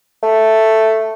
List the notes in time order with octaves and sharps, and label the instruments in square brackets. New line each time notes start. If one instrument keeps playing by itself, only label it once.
[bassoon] A3